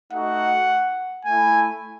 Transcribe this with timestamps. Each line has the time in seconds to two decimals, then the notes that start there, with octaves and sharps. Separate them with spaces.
0.11 A3 D#4 F#4 F#5
1.25 A3 E4 G#5